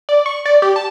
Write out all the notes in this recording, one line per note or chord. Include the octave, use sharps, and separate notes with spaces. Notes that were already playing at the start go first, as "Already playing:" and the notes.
D5
C#6
D5
G4
A5